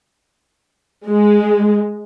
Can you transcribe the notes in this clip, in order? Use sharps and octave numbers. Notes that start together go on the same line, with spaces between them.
G#3